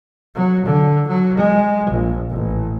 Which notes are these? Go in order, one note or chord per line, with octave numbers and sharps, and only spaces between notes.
F#3
D3
F#3
G#3
A#1
A1